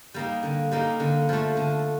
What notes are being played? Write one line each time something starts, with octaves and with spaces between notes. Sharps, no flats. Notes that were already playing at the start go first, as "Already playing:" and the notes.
G3 A#3 D#4
D3
G3 A#3 D#4
D3
F3 A3
D3